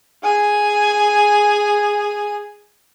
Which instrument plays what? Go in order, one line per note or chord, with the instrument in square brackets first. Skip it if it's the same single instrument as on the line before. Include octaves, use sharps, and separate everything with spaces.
[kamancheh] G#4 G#5